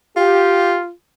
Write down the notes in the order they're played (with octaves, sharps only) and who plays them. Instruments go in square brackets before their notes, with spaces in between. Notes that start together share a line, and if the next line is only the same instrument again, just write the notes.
[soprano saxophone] F4 [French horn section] G4